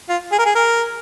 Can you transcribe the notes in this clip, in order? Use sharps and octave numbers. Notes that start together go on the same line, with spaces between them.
F4
G#4
A#4
G#4
A#4